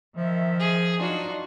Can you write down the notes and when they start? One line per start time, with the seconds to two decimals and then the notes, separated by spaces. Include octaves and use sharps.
0.16 D#3 F3 E5
0.60 G#4
0.99 F#3 D4 D#4 F4 F#4